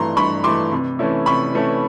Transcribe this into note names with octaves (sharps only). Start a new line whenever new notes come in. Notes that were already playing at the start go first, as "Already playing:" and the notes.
Already playing: G2 E3 A3 A#5 C6
G2 B5 C#6
E3 A3 C6 D6
C3
E3 A3 C#4 E4
C3 B5 C#6
E3 A3 C#4 E4